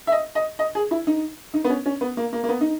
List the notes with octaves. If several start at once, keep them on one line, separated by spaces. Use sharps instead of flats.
E5
D#5
D#5
D#5
G#4
E4
D#4
D#4
B3
C#4
C#4
B3
A#3
A#3
A#3
B3
D#4